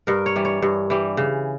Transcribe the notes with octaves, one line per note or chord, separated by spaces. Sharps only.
G2 A#4
C#5
E3 G3
C#5
G2
E3 G3
C#3